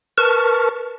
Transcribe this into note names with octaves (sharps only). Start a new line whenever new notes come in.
A#4 B4 A5 C#6 F6